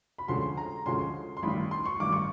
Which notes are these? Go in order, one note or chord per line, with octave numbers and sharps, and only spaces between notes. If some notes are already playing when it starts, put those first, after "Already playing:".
B5
D2 D3 F3 G#3 C#4 C6
A#5
D2 D3 F3 G#3 C#4 C6
C6
A1 G2 D#3 B5
C6
C#6
A1 G2 D#3 D6
C#6